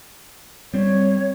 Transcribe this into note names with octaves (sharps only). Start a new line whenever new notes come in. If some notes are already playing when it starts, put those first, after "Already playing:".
G3 C4 C#5